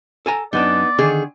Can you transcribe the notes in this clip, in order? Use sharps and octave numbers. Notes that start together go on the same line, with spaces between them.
A4 G#5 A#5
F#2 B3 D4 D#4 D5
D3 D#3 G#4